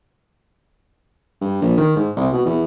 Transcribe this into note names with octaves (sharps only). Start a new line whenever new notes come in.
G2
A#1
D#3
G#2
C2
B2
E2